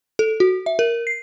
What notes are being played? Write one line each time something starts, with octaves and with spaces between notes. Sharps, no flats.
A4
F#4
E5
A#4
C7